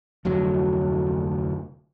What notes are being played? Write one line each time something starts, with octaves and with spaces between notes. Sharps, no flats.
F1 D2 F#3